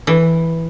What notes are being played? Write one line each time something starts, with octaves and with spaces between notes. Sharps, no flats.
E3